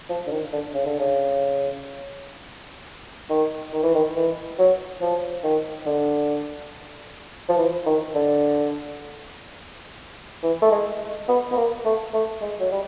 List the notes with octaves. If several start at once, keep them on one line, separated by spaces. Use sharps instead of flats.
F3
D3
D#3
D3
C#3
D3
C#3
D#3
D#3
E3
D#3
E3
F#3
F3
D#3
D3
F3
E3
D#3
D3
E3
A3
G#3
B3
B3
A#3
A3
A3
G#3
F#3
G3